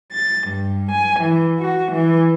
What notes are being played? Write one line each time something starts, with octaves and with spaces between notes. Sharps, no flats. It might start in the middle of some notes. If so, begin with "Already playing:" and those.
A6
G2
G#5
E3
F#4
E3